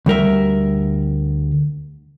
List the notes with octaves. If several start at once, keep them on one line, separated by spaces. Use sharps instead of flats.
D2 G3 A#4 E5